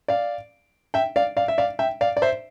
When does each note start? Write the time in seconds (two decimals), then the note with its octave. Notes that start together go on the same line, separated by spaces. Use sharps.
0.08 D5 F5
0.94 E5 G5
1.16 D5 F5
1.37 D5 F5
1.48 E5
1.58 D5 F5
1.79 E5 G5
2.01 D5 F5
2.17 D5
2.22 C5 E5